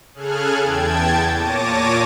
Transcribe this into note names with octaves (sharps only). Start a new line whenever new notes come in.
C#3 G#4 A4 F6 F#6 G#6
E2 G5 A5 G#6
A#2 C#5 A5 D6 A#6 D#7